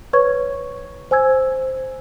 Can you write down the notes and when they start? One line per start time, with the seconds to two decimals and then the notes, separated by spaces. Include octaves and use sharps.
0.13 B4 C#5 C#6 G#6
1.11 C5 G#5 E6 G#6